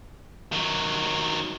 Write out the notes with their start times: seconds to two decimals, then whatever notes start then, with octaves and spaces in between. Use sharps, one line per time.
0.53 D#3 F#3